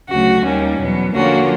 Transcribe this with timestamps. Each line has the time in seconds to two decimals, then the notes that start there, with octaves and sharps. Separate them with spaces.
0.09 D2 C#3 F#3 A3 F#4
0.44 D#2 D#3 G3 A#3 C#4
0.80 E2 B2 F#3 B3
1.14 D3 F3 A#3 C#4 F4 F#4